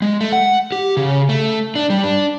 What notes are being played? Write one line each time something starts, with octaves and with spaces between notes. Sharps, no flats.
G#3
A3
F#5
G4
C#3
A3
D4
G3
D4